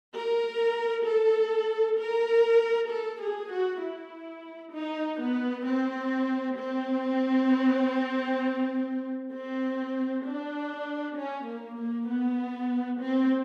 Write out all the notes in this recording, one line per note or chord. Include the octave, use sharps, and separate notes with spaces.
A#4
A4
A#4
A4
G#4
F#4
E4
D#4
B3
C4
C4
C4
D4
C#4
A#3
A#3
B3
C4